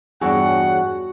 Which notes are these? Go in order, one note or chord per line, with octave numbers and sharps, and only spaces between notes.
E2 G2 D4 F#4 G#4 C#5 F#5